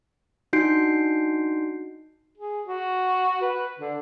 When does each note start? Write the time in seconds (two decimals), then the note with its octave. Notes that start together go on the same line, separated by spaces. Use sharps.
0.53 D4 D#4 F#4 G6 C7 D7
2.37 G#4
2.67 F#4
3.41 B4
3.79 D3